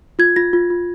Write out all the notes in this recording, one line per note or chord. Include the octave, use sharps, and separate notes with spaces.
F4 G#6
F4 A#6
F4
F4